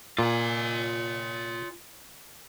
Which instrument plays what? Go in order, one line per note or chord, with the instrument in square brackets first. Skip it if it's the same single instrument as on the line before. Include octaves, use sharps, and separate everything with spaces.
[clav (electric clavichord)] A#2 [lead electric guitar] F4 G#5